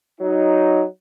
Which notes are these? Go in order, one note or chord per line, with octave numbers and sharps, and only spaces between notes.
F#3 D#4